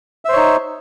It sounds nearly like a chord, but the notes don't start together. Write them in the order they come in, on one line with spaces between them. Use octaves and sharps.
E5 C5 C#5 D#4